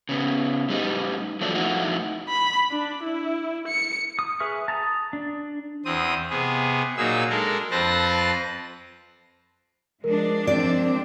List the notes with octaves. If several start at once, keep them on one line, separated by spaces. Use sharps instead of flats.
C#3 B3
A2 G3 D#4
F3 F#3 A3 D4
F2 A3 D#4 E4 F#4
B5
D4
E4
C#7
D#6
G#4 B4 E5 C#6 F6
A5 A#5 D#6
D4
E2 C4 D#6
C3 B3 G#4
A#2 F#3 D#4 G#4 E6
G#3 D4 A4 A#4
F2 C4 B4 C5 A5 A#6
F3 G#3 D4 A#4
C4 D5